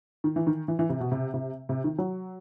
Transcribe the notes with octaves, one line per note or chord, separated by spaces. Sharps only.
D#3
E3
D#3
E3
E3
C3
B2
C3
C3
C3
D#3
F#3